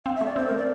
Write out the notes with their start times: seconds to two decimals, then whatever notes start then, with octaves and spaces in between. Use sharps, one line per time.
0.06 C4 F5
0.15 E5
0.21 A3 D5
0.36 C4 C5
0.47 A3 A#4
0.57 D5